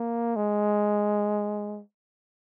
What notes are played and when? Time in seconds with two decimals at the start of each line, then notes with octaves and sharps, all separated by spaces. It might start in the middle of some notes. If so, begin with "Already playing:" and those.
Already playing: A#3
0.36 G#3